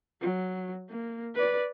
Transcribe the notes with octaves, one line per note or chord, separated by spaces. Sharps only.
F#3
A#3
B4 D5